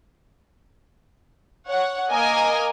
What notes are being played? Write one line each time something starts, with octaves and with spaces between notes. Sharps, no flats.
C#5 F#5
A#3 A#4 D#5 G#5